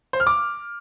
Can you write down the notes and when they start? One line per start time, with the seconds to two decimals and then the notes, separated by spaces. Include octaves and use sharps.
0.13 C5
0.20 F6
0.27 D6